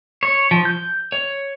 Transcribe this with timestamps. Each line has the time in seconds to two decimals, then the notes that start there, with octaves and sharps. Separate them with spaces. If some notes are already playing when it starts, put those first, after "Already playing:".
0.23 C#5
0.51 F3
0.65 G6
1.12 C#5